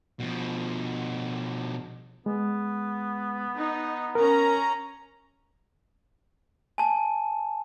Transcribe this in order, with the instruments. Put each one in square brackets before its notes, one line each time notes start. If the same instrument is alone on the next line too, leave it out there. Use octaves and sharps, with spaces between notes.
[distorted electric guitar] B2 F3
[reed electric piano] G#3 [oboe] B3
[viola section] D#4
[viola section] C#4 A#5 [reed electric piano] A#4
[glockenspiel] G#5 A5